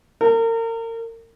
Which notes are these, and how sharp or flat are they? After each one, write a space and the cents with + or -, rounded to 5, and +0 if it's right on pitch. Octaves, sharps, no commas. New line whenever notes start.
A#4 -35